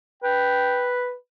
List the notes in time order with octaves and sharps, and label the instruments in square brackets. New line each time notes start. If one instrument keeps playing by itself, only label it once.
[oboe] B4 [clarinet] G5